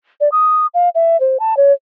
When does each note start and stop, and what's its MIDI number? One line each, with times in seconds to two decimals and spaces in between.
0.20 0.29 74
0.32 0.67 87
0.74 0.89 77
0.95 1.19 76
1.20 1.37 72
1.40 1.57 81
1.57 1.72 73